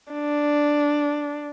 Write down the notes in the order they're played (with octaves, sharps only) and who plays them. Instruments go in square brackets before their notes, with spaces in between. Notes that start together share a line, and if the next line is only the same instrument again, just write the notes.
[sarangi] D4